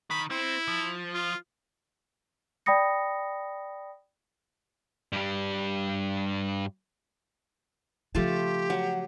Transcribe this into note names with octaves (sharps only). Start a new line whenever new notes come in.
D#3 B5
C4 E4
F3
F4
D5 G5 B5 D#6 A#6 C#7
G2 G3
C#3 F3 A3 F4 G4 A5
F#3 F#5